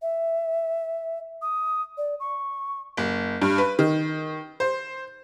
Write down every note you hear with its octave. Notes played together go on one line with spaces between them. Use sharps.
E5
D#6
D5
C#6
F#1
G2
B4
D#3
C5